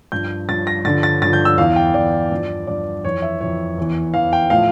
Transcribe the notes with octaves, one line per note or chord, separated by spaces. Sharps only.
G2 F3 G6
G2 F3 A6
A#6
G2 D3 F3 A6
A6
G2 D3 F3 A6
G6
E6
E2 E3 F5
G5
E2 E3 D5
G2 F3
G2 F3 D5
F2 E3 C#5
E5
F2 E3 C#5
E2 E3
E2 E3 F5
G5
A2 F3 F5